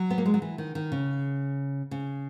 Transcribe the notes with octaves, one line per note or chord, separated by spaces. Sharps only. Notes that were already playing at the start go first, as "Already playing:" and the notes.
Already playing: F#3
B3
A#3
G#3
F#3
E3
D#3
D#3
C#3
C#3